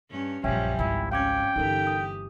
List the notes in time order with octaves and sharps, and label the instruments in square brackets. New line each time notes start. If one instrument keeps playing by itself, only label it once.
[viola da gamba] G2 C#4
[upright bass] A#1 F#2 [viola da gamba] F3 G3 [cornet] C#4 [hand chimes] E5 G5 G#5
[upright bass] G#1 C#2 [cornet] E4
[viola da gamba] C4 C#4 [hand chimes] F5 D6 G#6 [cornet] G5
[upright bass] G1 D3 [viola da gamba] E3 G4 [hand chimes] D#4 A4 A#4
[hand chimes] D#6